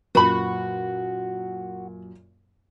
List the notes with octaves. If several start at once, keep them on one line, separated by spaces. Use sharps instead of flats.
F#2 A#2 F#4 B4 B5